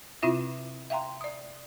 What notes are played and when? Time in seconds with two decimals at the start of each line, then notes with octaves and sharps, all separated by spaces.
0.22 C3 C4 E4 F4 E5 A#6
0.90 E5 F5 G5 A#5 C6
1.21 D5 D#6